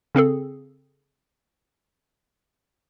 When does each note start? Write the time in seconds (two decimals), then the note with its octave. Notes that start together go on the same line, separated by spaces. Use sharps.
0.15 C#3 C4 G#4 A4